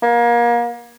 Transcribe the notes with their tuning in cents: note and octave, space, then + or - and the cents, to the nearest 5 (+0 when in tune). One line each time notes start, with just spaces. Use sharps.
A#3 +30